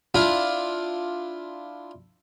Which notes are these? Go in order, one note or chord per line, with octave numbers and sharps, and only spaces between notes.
D4 E4 F4